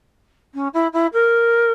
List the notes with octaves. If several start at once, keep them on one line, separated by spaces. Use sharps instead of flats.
C#4
E4
E4
A#4